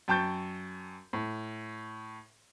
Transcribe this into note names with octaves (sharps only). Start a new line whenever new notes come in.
F#2 G5 A5 C#6 G6 A6
A2